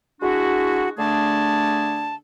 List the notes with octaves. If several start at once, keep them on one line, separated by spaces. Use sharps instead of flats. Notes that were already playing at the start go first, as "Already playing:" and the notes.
G#3 D4 E4 F#4
D3 A3 D4 G#4 A5